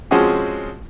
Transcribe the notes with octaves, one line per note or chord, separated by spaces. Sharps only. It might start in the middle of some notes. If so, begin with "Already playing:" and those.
F3 G#3 C4 C#4 F#4 G#4